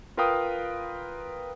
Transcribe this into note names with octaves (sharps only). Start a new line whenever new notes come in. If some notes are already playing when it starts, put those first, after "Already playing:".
F4 A#4 B4 F5 G5 D#6